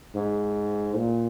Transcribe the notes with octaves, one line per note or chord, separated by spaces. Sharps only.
G#2
A#2